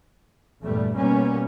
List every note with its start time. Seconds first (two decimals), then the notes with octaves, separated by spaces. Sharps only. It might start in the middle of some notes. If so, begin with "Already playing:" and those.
0.62 E2 G2 A#2 G3 A3
0.96 B2 G3 A#3 B3 C#4